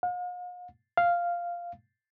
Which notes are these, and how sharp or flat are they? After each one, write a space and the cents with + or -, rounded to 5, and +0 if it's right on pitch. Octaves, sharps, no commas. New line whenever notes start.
F5 +45
F5 -5